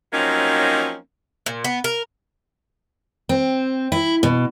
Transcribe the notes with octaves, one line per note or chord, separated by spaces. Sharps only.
F3 F#3 A#3 C4 C#4 D#4
A#2
B3
A#4
C4
E4
B2